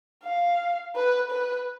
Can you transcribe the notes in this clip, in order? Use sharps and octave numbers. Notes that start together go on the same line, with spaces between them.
F5
B4
B4